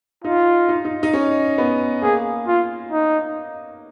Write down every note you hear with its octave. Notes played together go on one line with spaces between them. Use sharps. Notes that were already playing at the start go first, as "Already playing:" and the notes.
D#4 F4
D#4
D#4
D#4
C#4
B3
A#3 G#4
F4
D#4